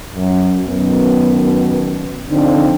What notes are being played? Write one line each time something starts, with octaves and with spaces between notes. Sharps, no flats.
F#2
F#2 B2 D#3 B3
D3 F3 C4 D4 D#4